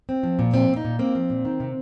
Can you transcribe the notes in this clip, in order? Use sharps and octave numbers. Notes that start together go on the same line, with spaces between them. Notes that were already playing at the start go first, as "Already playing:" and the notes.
C4
F3
A#2
F3 C4
A#2
D#4
A#2
A#3 C4
F3
A#2
D#3
C3